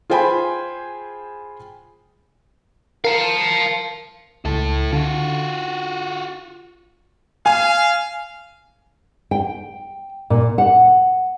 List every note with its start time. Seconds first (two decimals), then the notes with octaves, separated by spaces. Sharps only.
0.10 F4 G#4 C5 G5 G#5 B5
3.05 A#4 F5 A5 C#7
4.45 C#2 E4 A4
4.92 D3 F4 F#4
7.46 F5 G#5
9.31 G5
10.30 A#2
10.58 F#5